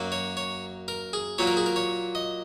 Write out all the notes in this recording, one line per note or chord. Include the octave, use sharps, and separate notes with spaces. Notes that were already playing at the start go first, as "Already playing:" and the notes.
Already playing: F#2 F#3 A#3
C#5
C#5
A#4
G#4
A#2 F#3 A#3 C#5
A#4
G#4
A#4
C#5
D#5